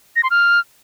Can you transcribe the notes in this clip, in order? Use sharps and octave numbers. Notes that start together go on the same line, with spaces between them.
A#6
C6
F6